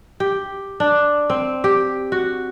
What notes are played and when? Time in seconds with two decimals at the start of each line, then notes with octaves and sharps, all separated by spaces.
0.20 G4
0.80 D4
1.30 C4
1.64 G4
2.12 F#4